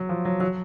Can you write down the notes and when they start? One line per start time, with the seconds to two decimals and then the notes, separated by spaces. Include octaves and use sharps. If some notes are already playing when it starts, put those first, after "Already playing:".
Already playing: F#3
0.09 F3
0.25 F#3
0.40 F#3